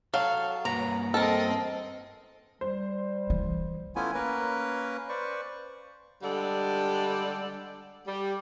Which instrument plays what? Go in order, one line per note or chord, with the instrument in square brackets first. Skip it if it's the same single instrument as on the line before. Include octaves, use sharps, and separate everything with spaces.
[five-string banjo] F#3 [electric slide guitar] A4 [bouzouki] F5
[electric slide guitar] G2 A#3 B4 [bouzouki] A#5
[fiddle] C4 D#5 [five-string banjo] A4 A#4
[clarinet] G3 [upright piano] C5
[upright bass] E3
[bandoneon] A3 B3 C#4 E4 F4 G#5
A#3 C#4 A#4 B4
B4 C5 D5 C#6
[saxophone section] D3 G3 G#3 A4 D5 F#5
G3